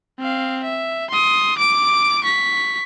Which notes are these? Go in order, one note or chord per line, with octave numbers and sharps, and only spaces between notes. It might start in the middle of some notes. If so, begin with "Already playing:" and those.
C4 F5
E5
C6 D#6
D6 D7
C#6 B6